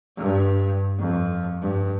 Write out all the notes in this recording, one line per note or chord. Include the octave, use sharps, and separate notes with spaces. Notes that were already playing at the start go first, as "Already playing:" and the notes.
G2
F2
G2